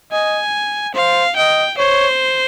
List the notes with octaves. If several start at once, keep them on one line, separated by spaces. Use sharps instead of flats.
D#5 G#5
C5 F5
D#5 G5
C5 C#5